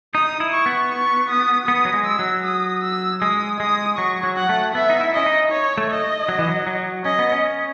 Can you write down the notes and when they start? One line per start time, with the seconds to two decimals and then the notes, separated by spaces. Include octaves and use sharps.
0.15 D#4 D#6
0.40 E4
0.53 C#6
0.66 B3
0.91 C#6
1.29 D#6
1.68 B3 D#6
1.85 F#3
1.93 G#3
2.06 E6
2.19 F#3
2.44 D#6
2.83 E6
3.21 G#3 D#6
3.60 G#3 D#6
3.98 F#3 C#6
4.23 F#3
4.37 F#5
4.49 A3
4.75 B3 E5
4.90 D#4
5.01 E4
5.13 C#4 D#5
5.26 D#4
5.52 C#5
5.78 A3
5.90 D#5
6.28 F#3
6.39 E3
6.48 F#3
6.67 F#3
7.05 C#4 D#5
7.19 B3
7.32 C#4